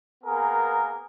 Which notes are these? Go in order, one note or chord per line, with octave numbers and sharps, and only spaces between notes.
A#3 B3 G#4 A#4